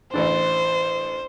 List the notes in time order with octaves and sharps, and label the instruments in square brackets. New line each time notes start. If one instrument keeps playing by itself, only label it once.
[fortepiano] A1 E3 D4 [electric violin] C5